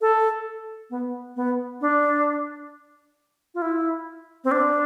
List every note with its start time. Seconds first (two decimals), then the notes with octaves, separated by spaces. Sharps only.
0.01 A4
0.90 B3
1.36 B3
1.81 D4
3.55 F4
3.62 E4
4.44 C4
4.51 D4